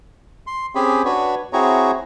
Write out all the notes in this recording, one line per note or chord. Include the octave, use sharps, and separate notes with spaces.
C6
C4 C#4 G4 G#4 B5
D4 F#4 B4 C#5
C4 E4 F#4 G#4 C#5 A#5